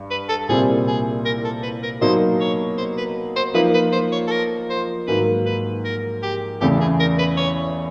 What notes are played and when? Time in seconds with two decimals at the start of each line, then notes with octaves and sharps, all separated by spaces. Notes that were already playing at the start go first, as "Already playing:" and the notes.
Already playing: G2
0.10 B4
0.29 A4
0.48 C2 A#2 G3 C4 E4 G#4
0.87 G#4
1.25 A#4
1.45 A4
1.63 B4
1.83 A#4
2.01 B2 F#3 A#3 D#4 C5
2.40 C#5
2.77 C5
2.98 B4
3.36 C5
3.54 F3 A#3 D#4 B4
3.74 B4
3.92 C5
4.12 C#5
4.27 A4
4.31 A#4
4.70 C5
5.07 G#2 D#3 F#3 A#3 B4
5.46 B4
5.84 A#4
6.22 G4
6.61 E2 C#3 E3 A3 G4
6.80 G#4
7.00 A#4
7.18 B4
7.37 C#5